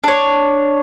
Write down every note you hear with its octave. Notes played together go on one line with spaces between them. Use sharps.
D4 C#5